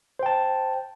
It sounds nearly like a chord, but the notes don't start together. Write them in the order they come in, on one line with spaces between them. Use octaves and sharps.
C5 G5 A5